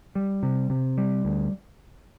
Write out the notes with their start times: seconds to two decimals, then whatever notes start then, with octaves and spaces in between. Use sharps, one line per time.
0.15 G3
0.43 C3
0.70 C3
0.98 G3
1.25 D2